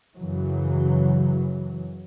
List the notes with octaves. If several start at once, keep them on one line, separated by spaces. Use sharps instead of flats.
F#2 C#3 E3 F#3